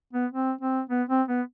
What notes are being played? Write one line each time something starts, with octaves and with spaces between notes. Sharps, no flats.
B3
C4
C4
B3
C4
B3